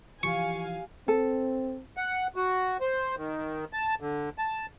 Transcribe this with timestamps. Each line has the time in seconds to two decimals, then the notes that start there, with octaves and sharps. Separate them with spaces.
0.23 E3 F3 G4 F5 G#5 C#6
1.08 C4 A4
1.97 F#5
2.36 F#4
2.81 C5
3.17 D#3
3.73 A5
4.00 D3
4.38 A5